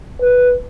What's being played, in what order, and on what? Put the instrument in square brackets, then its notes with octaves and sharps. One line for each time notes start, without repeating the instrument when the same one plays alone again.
[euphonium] B4